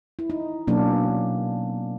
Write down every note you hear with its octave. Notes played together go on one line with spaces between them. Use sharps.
E4
D#4
B2 F#3 A#3 C#4 D4